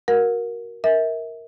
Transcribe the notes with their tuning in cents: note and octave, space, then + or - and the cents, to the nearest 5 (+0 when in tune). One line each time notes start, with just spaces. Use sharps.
F#4 +0 A#4 +10 F#5 -40
A#4 +0 E5 -35